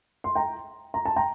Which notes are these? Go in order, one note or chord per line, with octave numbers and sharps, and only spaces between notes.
C6
G5 A#5
A#5
A5
G5 A#5